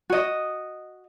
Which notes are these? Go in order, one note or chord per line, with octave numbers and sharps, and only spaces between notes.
F#4 D#5